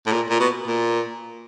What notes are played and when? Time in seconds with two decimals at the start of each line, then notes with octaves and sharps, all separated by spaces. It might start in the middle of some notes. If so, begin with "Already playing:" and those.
0.07 A2
0.12 A#2
0.30 A#2
0.40 B2
0.67 A#2